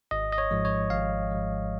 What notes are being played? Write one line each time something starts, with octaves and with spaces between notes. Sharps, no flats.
G#1 D#5
D#5
C#5
G#2 F3 G#3
C#5
G#1 F5
G#2 F3 G#3